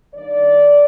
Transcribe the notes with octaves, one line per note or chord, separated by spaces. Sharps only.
G2 D#3 G3 A#3 D5